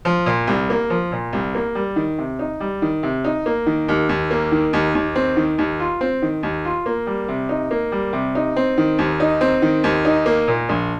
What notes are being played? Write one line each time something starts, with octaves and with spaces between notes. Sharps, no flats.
F3
A#2
C2
A#3
F3
A#2
C2
A#3
G3
D#3
C3
D#4
G3
D#3
C3
D#4
A#3
D#3
D#2
D#2
A#3
D#3
D#2
D#2
C4
D#3
D#2
F4
C4
D#3
D#2
F4
A#3
G3
C3
D#4
A#3
G3
C3
D#4
C4
D#3
D#2
D#4
C4
D#3
D#2
D#4
A#3
A#2
A#1